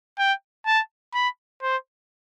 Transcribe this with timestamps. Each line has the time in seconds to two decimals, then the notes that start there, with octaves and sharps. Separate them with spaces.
0.19 G5
0.66 A5
1.14 B5
1.62 C5